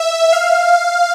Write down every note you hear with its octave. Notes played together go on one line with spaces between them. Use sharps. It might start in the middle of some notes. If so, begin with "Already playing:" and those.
Already playing: E5
F5